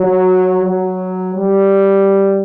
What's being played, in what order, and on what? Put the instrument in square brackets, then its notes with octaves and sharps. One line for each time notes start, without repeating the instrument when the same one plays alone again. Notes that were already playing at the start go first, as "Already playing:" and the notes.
Already playing: [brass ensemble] F#3
F#3
G3